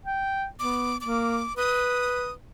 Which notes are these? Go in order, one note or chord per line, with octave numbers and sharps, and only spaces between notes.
G5
B3 D6
A#3 D6
B4 D#6